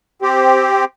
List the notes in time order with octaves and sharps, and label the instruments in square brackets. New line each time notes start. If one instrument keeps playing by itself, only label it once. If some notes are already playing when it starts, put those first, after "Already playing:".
[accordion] C4 G4